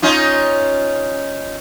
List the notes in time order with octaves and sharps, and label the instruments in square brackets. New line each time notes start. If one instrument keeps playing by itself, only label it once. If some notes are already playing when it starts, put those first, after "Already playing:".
[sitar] C#4 D#4 F4